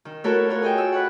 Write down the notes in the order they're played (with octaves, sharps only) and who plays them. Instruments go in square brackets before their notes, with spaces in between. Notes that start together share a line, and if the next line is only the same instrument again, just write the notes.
[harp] D#3
A3 E4 F#4 A4 A#4 C#5
F4 F#4 A#4 C#5
G#4 A4 D#5 G5
E6
B4 C#5 F#5